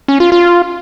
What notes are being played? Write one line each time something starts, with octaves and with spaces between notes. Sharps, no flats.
C#4
F4
F4